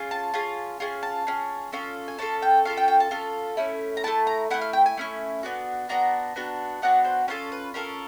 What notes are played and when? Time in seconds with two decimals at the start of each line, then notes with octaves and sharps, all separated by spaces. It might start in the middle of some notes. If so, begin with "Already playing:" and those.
Already playing: C#4 F4 G#4
0.11 A5
0.34 C#4 F4 G#4
0.80 C#4 F4 G#4
1.03 A5
1.27 C#4 F4 G#4
1.72 C#4 F4 A4
2.08 G#5
2.19 C#4 F4 A4 A5
2.42 G5
2.65 C#4 F4 A4 F5
2.77 G5
2.88 G5
3.00 A5
3.11 C#4 F4 A4
3.57 A3 C#4 E4
3.97 A#5
4.04 A3 C#4 E4 A5
4.27 A#5
4.50 A3 C#4 E4 F#5
4.61 F5
4.73 G5
4.86 G#5
4.97 A3 C#4 E4
5.43 B3 D4 F#4
5.89 B3 D4 F#4 A#5
6.36 B3 D4 F#4
6.82 B3 D4 F#4 F#5
7.05 C5
7.28 C#4 F4 A4 B4
7.52 B4
7.74 C#4 F4 A4 A#4